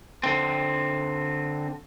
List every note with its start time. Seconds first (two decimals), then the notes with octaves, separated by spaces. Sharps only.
0.24 D3 C4